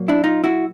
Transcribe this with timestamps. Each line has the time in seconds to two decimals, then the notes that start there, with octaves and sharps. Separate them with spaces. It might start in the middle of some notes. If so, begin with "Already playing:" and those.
Already playing: A#2 F#3 A#3
0.08 D4 E4
0.24 D#4 F4
0.44 E4 F#4